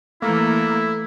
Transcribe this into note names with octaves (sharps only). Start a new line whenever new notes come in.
E3 A3 A#3 E4 A4